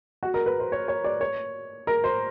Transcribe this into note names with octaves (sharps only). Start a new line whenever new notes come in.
F#4
A#4
B4
C5
C#5
C#5
D5
C#5
A#4
C5